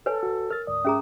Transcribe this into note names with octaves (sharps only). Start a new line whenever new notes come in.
A4 B4 C#5 G#5
D2 F#4
A#4 F6 A6
D2 G#2 D5 D#6
G#2 C#4 G#4 E5 A#5